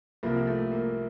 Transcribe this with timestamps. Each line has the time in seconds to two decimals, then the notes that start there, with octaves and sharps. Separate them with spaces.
0.23 C2 C3 F3 A#3
0.47 A3
0.72 A#3